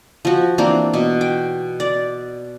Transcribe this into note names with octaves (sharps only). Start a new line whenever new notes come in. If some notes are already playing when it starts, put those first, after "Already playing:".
F3 F#4
E3 A#3 C4 D4
B2
G5
D5